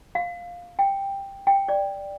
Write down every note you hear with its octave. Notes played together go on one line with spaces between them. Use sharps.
F5
G5
G5
D5